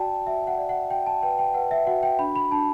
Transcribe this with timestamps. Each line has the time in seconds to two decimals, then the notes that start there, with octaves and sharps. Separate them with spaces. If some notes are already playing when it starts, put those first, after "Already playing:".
Already playing: F#4 D5 G5 A5
0.26 F#4 E5
0.47 F#5
0.58 D5
0.69 F#5
0.90 F#4 G5
1.06 A5
1.22 B4 G5
1.39 G5
1.54 B4 F#5
1.71 E5
1.87 F#4 F#5
2.03 G5
2.19 D4 B5
2.36 B5
2.51 D4 A5